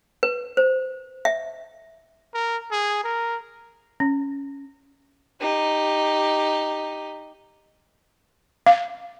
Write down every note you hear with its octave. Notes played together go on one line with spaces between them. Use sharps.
B4
C5
E5
A#4
G#4
A#4
C#4
D#4 G4
F5